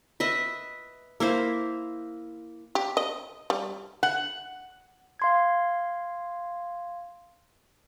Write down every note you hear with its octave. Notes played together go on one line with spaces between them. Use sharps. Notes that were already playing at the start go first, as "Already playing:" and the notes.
B4 D#5 E5
A#3 E4 C5 F5
G4
D#5
G3
F#5
F5 C6 G#6